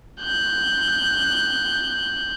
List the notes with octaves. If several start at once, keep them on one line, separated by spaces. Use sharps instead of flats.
F#6 G6